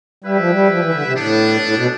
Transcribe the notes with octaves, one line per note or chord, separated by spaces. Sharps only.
G3 E4 B4 E5 G5
F3
G3
F3
E3
D3
C3
A2 G3 B3 D4
A2
B2